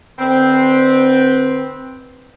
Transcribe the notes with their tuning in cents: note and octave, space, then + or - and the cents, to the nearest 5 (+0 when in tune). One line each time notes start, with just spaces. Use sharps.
D3 +35 C4 +0 B4 -15